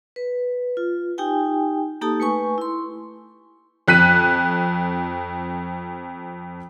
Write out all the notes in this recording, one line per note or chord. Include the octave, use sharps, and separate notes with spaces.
B4
F4
D#4 G4 G5 G#5
A#3 D#4 G4 A4 A5 D#6
A3 B4 G#5 C#6
E4 C6
F2 F#6 B6 D#7